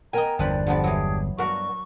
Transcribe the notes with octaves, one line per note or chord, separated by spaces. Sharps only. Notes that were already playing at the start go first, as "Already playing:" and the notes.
B3 A#4 D#5 G5 G#5 A#5
G1 E2 F3 D4 B4 D5
G2 D3 F3 B3 G4 A5
E3 F#3 G#4
G2 B3 F#4 A#4 C#6